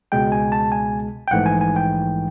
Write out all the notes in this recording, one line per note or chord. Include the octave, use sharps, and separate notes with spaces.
C#2 B2 G#3 G5
G#5
A5
G#5
G5
A#1 G#2 E3 A3 F#5
G#5
G#5
G5